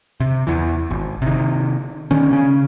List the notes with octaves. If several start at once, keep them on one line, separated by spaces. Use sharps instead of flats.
C3
E2 E3
G#1
C3 D#3
D#3 C#4
C#3 C#4